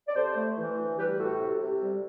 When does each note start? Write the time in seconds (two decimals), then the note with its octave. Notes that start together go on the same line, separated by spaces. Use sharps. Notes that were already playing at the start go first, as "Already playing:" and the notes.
0.08 D5
0.16 C3 A4 C5
0.37 A3
0.57 E3
0.78 D2
0.99 G3 G4 B4
1.19 A2 F#4 A4
1.40 C3
1.61 C3
1.82 G3